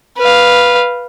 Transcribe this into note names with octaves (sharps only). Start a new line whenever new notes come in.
B4 F5